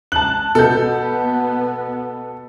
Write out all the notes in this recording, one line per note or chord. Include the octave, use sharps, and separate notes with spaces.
A5 F#6 F#7
B2 B3 A4 G6